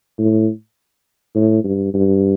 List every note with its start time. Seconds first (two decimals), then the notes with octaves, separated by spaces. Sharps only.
0.18 A2
1.35 A2
1.64 G2
1.94 G2